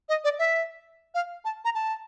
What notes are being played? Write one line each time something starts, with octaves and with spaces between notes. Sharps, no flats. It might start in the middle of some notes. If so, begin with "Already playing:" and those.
D#5
D5
E5
F5
A5
A#5
A5